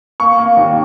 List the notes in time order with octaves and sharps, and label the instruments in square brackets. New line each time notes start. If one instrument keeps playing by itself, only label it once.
[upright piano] A#3 C#6
A#3
D#2